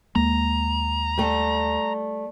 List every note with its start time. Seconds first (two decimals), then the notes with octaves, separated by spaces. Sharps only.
0.15 D#2 G#3 A#3 A#5
1.18 G3 A3